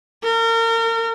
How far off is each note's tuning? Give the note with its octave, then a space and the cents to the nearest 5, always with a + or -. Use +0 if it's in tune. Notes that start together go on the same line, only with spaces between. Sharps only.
A#4 -35